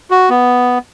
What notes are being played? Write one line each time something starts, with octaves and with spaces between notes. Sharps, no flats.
F#4
B3